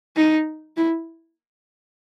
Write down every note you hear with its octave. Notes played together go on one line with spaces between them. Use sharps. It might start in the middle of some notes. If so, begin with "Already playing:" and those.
D#4
E4